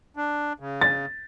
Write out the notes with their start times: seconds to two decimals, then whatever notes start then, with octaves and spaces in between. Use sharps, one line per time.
0.16 D4
0.60 C#3
0.81 A6